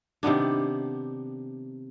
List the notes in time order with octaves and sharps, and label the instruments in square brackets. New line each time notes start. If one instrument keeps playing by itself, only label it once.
[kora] C3 D#3 B3 D4